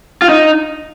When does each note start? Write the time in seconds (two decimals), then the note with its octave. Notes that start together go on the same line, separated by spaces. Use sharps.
0.22 F4
0.29 D#4